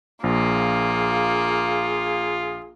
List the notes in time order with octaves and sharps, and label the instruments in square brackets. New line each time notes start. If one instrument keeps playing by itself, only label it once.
[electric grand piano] A#1 [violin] A#3 [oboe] F4 [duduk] G#4